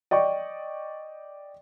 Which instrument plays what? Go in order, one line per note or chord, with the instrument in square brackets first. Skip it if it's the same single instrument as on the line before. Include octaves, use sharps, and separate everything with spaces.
[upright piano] D5 D#5 G5 C#6